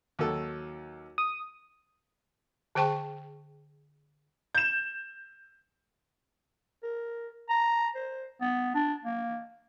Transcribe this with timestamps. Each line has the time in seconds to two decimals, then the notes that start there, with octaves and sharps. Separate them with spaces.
0.19 D#2 F#3 A4
1.18 D#6
2.75 D3 G#4 C5 G5 A5 C#6
4.55 G6 E7
6.83 A#4
7.49 A#5
7.95 C5
8.41 B3
8.75 D4
9.04 A#3